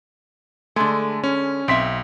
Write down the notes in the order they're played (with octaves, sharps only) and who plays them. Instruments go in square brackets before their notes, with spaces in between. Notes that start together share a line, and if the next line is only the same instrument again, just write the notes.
[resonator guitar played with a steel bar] D3 G#3 [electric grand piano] A3
[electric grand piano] C#4
[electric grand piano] B1 B6 [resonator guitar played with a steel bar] C4 E5